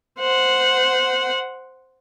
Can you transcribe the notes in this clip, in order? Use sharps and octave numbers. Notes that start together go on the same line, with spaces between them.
C5 F#5